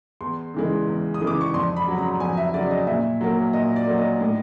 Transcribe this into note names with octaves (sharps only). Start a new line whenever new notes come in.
E2 C6
C#3 E3 G#3
E2
D#6
C#3 E3 G#3
D6
C#6
F2 C6
B5
C#3 F#3
A#5
F2 G#5
E5
C#3 F#3 D5
D#5
A#2 E5
F#3 A#3
A#2 D#5
D5
F#3 A#3
D#5
A2